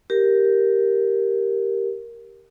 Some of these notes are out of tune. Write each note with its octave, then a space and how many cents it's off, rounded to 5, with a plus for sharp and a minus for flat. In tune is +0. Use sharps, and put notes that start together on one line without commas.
G4 +0 A#4 +0